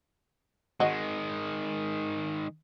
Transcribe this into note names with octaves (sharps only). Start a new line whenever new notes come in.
D#3 G#3 F#4 D#5